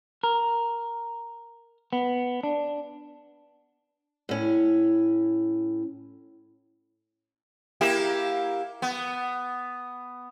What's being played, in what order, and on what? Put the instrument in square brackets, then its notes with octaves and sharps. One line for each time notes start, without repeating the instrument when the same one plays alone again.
[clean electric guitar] A#4
B3
D4
[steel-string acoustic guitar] A2 C#4
[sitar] A#3 E4 G4
B3